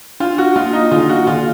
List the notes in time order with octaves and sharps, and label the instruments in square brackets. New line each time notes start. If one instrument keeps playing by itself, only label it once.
[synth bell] D4 [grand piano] F4
[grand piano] F#4
[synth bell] A#3 [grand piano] F4
[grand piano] D#4
[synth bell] D#3 [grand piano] F4
[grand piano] F#4
[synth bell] D#3 [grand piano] F4